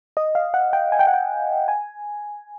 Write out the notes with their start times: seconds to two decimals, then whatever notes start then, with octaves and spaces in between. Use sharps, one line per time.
0.17 D#5
0.35 F5
0.54 F#5
0.73 G5
0.92 G#5
0.99 G5
1.07 F#5
1.14 G5
1.68 G#5